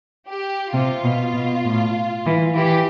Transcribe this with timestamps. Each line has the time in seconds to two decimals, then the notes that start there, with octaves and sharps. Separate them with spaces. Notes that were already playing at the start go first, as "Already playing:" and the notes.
0.28 G4
0.74 C3 F4
1.04 B2
1.34 B2
1.65 A2
2.26 E3
2.56 E3 G4